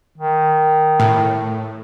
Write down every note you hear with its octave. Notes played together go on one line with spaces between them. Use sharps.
D#3
A2